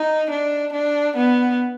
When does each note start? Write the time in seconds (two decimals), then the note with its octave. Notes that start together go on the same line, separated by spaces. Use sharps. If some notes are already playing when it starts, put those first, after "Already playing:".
Already playing: D#4
0.31 D4
0.73 D4
1.17 B3